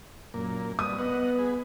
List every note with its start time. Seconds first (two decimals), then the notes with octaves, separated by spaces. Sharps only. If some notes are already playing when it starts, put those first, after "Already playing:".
0.34 F#2 A#2 A#3
0.79 G3 B4 D#6
0.98 B3 D#5 F#5
1.39 G#4 B4